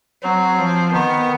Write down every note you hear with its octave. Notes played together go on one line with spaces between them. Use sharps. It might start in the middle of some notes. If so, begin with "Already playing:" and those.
F#3 C4
F3
D#3 B3